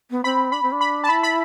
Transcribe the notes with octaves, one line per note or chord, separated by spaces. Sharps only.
B3
C4 B5
D4 B5
C4
D4
B5
A5
E4 B5
B5